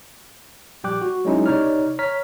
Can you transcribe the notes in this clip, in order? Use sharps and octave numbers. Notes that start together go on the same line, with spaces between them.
A#1 G3 G5 D6 F#6
F#4
F#3 G#3 C#4 D#4 E4
C3 D#4 C#5 D5 F6
C#5 A#5 F6 B6